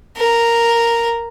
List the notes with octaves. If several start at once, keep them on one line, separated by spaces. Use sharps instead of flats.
A#4